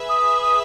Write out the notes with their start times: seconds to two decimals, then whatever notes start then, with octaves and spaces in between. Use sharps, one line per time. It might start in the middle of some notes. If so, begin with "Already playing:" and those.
Already playing: G#4 B4 E5
0.09 D#6
0.41 D#6